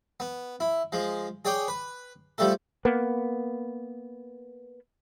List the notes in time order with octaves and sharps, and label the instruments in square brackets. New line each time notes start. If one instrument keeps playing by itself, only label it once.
[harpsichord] B3
E4
F3 G#3
G#4 C#5 D5 G5
B4
F3 G3 A3 A4
[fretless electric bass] A#3 B3